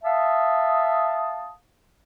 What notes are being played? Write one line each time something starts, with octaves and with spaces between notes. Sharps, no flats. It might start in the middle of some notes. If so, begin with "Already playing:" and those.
E5 F5 A5 D#6